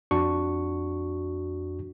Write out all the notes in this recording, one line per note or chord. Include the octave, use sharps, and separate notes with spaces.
F2 D4 F#4 C#6